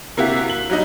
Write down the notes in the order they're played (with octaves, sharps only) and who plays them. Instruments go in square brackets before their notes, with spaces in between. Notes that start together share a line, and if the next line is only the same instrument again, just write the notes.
[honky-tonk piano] C3 A#3 E4 F#4 G4
F#7
F#3 G3 D#4